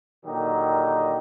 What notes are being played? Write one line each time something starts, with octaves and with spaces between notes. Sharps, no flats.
A#2 D3 D#3 F#3 D#4 G4